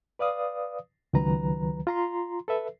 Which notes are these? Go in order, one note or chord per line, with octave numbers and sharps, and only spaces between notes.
B4 D5 F5 D#6
C#2 D#3 F#3 B4 A#5
F4 A#5 C6
A4 B4 E5